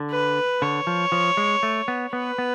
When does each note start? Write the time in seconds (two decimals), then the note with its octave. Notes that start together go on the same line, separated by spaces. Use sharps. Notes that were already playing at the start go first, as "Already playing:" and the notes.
Already playing: D3
0.11 B4
0.62 D3 C#5
0.87 F3
1.12 F3
1.37 G#3
1.63 A3
1.88 B3
2.13 B3 B4
2.38 B3